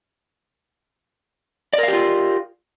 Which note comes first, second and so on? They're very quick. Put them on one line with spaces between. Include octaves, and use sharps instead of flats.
D5 A#4 F5 G4 F4